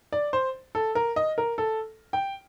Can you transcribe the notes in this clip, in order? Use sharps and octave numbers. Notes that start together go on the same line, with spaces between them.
D5
C5
A4
A#4
D#5
A#4
A4
G5